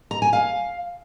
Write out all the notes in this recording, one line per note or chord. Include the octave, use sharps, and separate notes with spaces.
A#5
G#5
F5